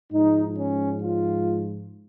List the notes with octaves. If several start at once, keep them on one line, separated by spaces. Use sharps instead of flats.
G#2 F3 G#3 D#4
C#4
F4